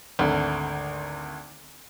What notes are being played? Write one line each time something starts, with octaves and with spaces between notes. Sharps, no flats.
G#1 D2